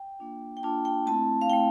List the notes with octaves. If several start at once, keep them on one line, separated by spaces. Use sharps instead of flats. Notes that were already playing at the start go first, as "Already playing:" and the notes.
Already playing: G5
A#3 D4 F4
G5
A#3 D4 F4 A5
G5
A3 C4 E4 A5
F5
A3 C4 E4 G5